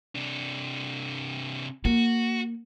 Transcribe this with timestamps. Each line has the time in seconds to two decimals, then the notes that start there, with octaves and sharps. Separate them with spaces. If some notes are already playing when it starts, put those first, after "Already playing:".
0.15 C3 D4
1.85 A#3 F#4